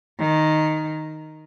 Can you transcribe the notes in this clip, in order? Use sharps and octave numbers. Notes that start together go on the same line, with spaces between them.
D#3